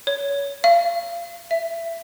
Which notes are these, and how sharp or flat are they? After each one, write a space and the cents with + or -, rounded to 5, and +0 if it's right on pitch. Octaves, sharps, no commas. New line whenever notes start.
C#5 +25
F5 -30
E5 +20